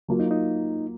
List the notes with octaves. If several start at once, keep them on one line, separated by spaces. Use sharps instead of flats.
F#3 A#3 F4
D#4
D#4